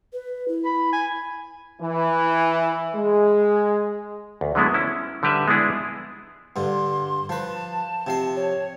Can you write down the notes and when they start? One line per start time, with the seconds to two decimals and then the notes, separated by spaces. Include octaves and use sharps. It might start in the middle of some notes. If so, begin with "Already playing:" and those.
0.13 B4
0.48 E4
0.65 B5
0.93 G#5
1.82 E3
2.96 G#3
4.41 D2
4.55 D3 F#3 G#3 B3 E4
4.74 C#4 E4
5.23 D3 G3 G4 B4 E5
5.48 G#3 B3 D4 E4 G#4
6.56 G2 D3 C6
7.29 F3 B4 A5
8.07 C3 F3 F5
8.36 C#5